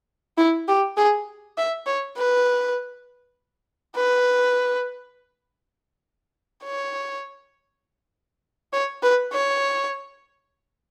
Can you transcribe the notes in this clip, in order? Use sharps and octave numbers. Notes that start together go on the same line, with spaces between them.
E4
G4
G#4
E5
C#5
B4
B4
C#5
C#5
B4
C#5